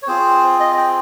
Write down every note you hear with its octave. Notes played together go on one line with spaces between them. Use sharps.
C#5
C4 F4 G#4 C5
D#5
G5